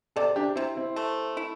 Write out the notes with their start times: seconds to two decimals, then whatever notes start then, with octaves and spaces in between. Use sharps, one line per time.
0.16 C3 A4 D5
0.36 D4 G4
0.56 C3 C4 E4
0.76 C4 E4
0.96 A3
1.37 E4